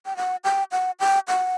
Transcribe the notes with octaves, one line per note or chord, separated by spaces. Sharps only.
G5
F#5
G5
F#5
G5
F#5